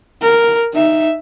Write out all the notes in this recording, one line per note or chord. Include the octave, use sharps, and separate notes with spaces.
A#4
D#4 E5